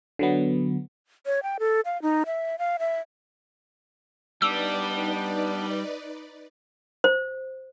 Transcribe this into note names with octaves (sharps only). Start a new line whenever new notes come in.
D3 F#3 B3
C#5
G5
A4
F5
D#4
E5
F5
E5
G3 B3 D4 D#4 B4 D5 D6 E6
C5